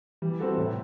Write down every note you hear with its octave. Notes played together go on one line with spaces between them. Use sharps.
E3 G3
C4 F#4 A4
A2 C3